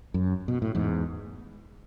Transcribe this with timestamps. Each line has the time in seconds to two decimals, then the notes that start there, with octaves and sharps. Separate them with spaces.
0.14 F#2
0.48 B2
0.62 A2
0.75 E2 G#2